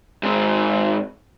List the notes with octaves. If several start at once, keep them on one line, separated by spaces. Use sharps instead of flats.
G#2 C4